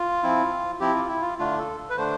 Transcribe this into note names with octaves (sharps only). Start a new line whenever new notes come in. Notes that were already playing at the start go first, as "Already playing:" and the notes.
Already playing: F4
F3 C4 E4
F3 C4 E4 G4
F4
E4
F4
D3 A3 D4 F4
A4
B4
D3 A3 D4 C5